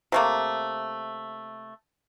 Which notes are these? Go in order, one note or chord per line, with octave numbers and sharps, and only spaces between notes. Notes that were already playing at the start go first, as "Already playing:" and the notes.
C3 A3 A#3